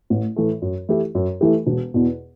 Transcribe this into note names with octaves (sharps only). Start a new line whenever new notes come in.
A1
A2 E3 A3
F#2
E3 A3 E4 G4
F#2
E3 A3 E4 G4
E1
E2 B2